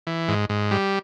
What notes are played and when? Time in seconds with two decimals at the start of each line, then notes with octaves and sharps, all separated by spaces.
0.07 E3
0.28 G#2
0.49 G#2
0.71 G3